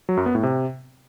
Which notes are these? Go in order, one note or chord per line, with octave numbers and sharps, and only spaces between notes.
F#3
F#2
B3
A2
C3